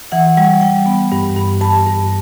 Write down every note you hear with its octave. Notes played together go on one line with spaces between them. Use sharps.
E3 F#5
G3 F#5
G3 G5
B3
G2
G2
G2 A5
G2